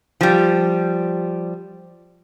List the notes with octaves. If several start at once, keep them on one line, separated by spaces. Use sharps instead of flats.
F3 G3